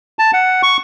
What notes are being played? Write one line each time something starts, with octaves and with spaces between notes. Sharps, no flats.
A5
F#5
C#6